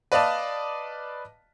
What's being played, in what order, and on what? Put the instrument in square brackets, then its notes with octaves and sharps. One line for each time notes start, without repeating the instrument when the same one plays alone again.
[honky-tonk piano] B4 D5 D#5 F5 A5